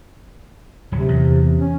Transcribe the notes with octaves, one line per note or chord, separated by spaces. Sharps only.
D1 C3 F#3
E2
C#4